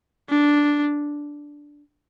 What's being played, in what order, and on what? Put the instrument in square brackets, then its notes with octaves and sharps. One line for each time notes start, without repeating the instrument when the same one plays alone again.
[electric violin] D4